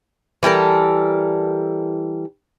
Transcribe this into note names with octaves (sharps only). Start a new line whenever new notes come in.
E3 G3 A4 A#4